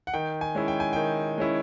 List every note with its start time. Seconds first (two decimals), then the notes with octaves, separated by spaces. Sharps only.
0.07 F#5
0.14 D#3 G5
0.41 G#5
0.55 G#3 C#4 E4
0.68 G5
0.80 G#5
0.93 D#3 G5
1.38 G#3 C#4 E4